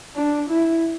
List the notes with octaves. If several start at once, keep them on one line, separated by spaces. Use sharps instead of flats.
D4
E4